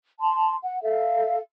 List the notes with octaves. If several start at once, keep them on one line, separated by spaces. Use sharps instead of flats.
A5 C6
F#5
A4 E5 F5